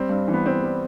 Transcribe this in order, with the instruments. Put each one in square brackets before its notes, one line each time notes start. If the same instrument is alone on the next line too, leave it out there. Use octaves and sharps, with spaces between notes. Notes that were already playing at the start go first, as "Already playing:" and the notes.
Already playing: [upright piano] G3 C4
G2
E3
B3
G2 C4
G3